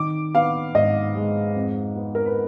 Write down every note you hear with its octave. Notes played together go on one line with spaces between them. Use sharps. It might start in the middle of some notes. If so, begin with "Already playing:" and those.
Already playing: D#3 D6
B3 F5
G#2 D#5
G#3
F2
B3
A#4
B4